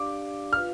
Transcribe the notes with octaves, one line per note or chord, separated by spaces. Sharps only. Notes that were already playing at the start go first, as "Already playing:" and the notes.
Already playing: D4 G4 D5 F5 D6
F4 B4 F5 F6